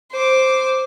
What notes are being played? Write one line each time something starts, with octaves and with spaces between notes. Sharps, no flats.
C5 D6